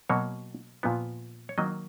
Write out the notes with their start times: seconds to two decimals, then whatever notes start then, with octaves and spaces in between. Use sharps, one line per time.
0.09 B2 F#3 A#3 C#5
0.83 A#2 F3 B3
1.49 C#5
1.58 D#3 F#3 A#3 D#5